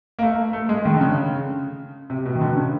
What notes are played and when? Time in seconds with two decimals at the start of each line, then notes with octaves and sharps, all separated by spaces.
0.19 A#3
0.23 A3
0.53 A3
0.69 G#3
0.85 D#3
0.94 D3
1.01 C#3
2.10 C3
2.26 B2
2.35 D#3
2.41 D3
2.57 C#3